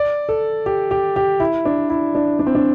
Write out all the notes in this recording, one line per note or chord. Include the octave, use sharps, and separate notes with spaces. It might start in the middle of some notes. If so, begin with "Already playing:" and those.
Already playing: D5
A4
G4
G4
G4
E4
D4
E4
D4
D4
C4
D4